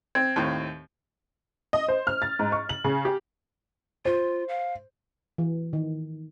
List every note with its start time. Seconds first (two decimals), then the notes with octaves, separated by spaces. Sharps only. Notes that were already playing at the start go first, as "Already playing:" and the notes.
0.15 C4 G#6
0.36 D#2 A2 C4
1.73 D#5
1.88 C5
2.07 F6
2.22 A6
2.39 G#2
2.52 C#6
2.69 F#7
2.84 C#3
3.05 G4
4.05 F4 C5
4.49 F5
5.38 E3
5.73 D#3